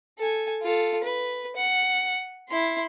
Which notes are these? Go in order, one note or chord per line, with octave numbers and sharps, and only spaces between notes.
A4 G#5
F4 A4
B4
F#5
E4 C6